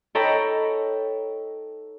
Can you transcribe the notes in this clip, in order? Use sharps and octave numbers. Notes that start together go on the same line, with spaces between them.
D#4 A4 C#5 G5 A#5 B5